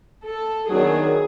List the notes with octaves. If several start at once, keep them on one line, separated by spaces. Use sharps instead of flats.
A4
D#3 F#3 B3 D4 G#4